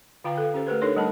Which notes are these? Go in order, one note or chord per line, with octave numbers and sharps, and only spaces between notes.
D3 F4 F5 G5 A#5 D6
A4 F5
C#4 G4 C5
A3 G4 A#4 B4
D4 D#4 A4 A#4 C#5 C6
G3 A3 D4 A#4 A5 B5